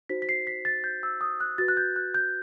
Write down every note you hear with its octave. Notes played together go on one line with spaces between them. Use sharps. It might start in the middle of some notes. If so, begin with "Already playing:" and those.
D#4 F#4 C5 B6
B6
C7
B6
A6
G6
E6
D#6
F#6
F#4 B4 A6
F#6
G6
F#6
G6